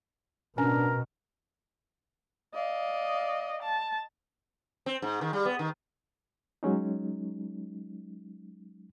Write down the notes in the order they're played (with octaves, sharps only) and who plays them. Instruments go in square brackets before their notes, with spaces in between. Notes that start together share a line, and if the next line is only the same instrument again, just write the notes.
[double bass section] B2 [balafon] C#4 [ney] D4 [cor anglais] A#4
[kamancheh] D5 F5 [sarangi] D#5
[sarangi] A5
[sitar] C4
G#2
D#3
G3
B3
D#3
[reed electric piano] F#3 G#3 C#4 D#4